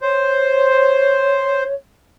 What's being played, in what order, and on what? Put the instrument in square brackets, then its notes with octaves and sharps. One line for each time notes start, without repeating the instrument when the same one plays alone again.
[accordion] C5 [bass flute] C#5